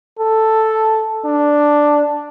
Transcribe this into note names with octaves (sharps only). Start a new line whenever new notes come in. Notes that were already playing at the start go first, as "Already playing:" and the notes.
A4
D4